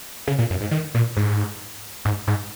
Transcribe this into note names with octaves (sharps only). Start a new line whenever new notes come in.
C#3
A#2
F#2
G#2
D#3
A#2
G#2
G#2
G#2